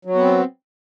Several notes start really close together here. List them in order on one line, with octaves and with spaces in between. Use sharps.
F#3 F#4 B3 C4